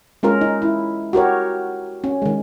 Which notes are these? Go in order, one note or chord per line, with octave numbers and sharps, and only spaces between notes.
G#3 C#4 F4 A#4
D#4
E4
F#4 G4 A#4 C#5
C#4
D#3 G#3